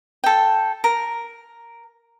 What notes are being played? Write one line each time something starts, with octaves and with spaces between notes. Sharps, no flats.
A4 G5
A#4